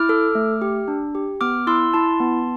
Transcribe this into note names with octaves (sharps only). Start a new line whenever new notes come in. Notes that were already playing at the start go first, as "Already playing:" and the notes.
Already playing: E4 D6 F6
A4
A3
G4
D4
G4
B3 D6 F6
E4 C6 E6
E4 A5 C6
B3